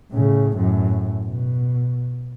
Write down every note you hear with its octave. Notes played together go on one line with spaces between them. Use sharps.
A2 C#3
F#2 A2
B2